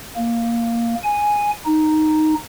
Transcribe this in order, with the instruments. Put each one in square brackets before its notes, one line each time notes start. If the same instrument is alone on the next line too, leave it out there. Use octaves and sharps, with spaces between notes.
[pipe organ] A#3
G#5
D#4